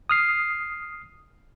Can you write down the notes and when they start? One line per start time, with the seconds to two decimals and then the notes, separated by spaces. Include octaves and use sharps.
0.10 D#6 F6 C7